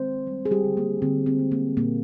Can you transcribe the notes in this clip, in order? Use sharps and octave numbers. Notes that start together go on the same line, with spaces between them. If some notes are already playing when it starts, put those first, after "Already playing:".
Already playing: D#3 G#3 C4 C5
G3
G#4
G3 G4
D3
A#3
D3 C4
C4
G#3
A#3
A#2 A#3